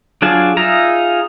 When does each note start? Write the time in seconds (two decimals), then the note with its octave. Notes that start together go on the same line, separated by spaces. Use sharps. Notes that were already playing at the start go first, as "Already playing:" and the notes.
0.22 F#3 D4 F4 G#4 A5
0.57 D#4 F4 G#4 E5 A#5